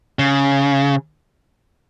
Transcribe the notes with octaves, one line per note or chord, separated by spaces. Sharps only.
C#3